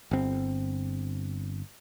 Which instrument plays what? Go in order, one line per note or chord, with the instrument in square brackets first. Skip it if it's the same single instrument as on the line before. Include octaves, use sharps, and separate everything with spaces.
[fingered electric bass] G1 C4